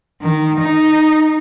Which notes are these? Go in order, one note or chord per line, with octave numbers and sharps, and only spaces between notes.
D#3
D#4